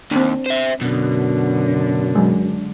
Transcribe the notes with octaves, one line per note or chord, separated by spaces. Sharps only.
D#2 C4 D4
C5 E5
F#2 B2 D3
F#3 G#3